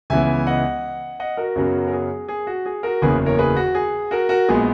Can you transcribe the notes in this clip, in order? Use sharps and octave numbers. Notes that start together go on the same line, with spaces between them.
C#2 C#3 E3 B3 E5 G#5
D#5 F#5
D#5 F#5
F#4 A#4
F#2 C#3 F#3 B3
A#4
G#4
G#4
F#4
G#4
F#4 A#4
F#1 E2 C#3 F#3 A#3 G#4 B4
A#4 C#5
G#4 B4
F#4
G#4
F#4 A#4
F#4 A#4
A#1 A#2 G#3 B3 G#4